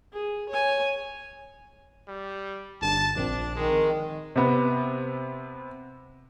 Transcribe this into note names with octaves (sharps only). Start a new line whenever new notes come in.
G#4
C#5 G#5
G3
G1 G2 A5
A#1 F3 C4 D4
D#3 G#3
C3 B3